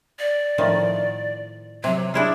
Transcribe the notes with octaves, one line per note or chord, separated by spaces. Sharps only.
D5
A2 D#3 F3
C3 F#3
D4 E4 F4 G#4